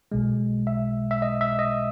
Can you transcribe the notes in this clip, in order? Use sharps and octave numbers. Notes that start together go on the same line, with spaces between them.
B1 B2 G#3
E5
E5
D#5
E5
D#5